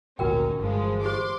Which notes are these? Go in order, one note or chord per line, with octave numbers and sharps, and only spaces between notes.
G#1 D2 A#2 C#4 D#4 F#4 A#4 G5
G1 E3 F3 G#3
G4 C5 C6 D6